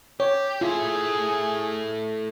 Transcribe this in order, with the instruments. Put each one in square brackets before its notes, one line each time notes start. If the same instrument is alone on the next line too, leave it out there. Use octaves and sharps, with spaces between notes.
[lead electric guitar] G4 [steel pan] C#5
[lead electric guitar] A3 E4 [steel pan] F4 [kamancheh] G#4